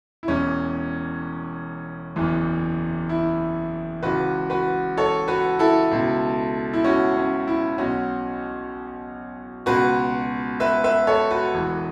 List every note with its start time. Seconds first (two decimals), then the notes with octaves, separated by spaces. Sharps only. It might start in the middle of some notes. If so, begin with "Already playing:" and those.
0.23 E4
0.28 E1 E2 E3 C#4
2.16 F#1 E2 E3
3.09 E4
4.03 C#2 C#3 E3 F#4 B4
4.50 F#4 B4
4.97 A4 C#5
5.28 F#4 B4
5.59 E4 A4
5.91 C#2 B2
6.73 E4
6.84 C#4 F#4
7.17 C#4
7.47 E4
7.78 B1 B2 C#4 F#4
9.66 C#2 B2 F#4 B4
10.60 B4 E5
10.84 B4 E5
11.07 A4 C#5
11.31 F#4 B4
11.54 E1 E2 E3